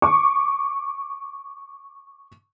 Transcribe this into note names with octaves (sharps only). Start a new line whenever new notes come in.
C#6 D6